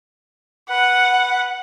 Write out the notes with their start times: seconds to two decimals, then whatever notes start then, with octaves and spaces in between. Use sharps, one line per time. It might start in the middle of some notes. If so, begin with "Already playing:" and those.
0.70 B4 F#5